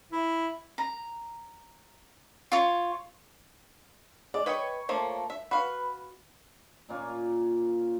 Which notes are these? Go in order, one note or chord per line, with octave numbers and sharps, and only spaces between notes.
E4
A#5
F4 C#5
G#3 D5
B4 C#5 D#5 G5 C#6
F3 A3 A#3
E5
F#4 B4 F5
A#2 A#3 C#4 F4